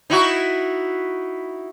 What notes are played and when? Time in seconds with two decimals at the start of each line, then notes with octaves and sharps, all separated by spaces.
0.10 D#4 E4 F#4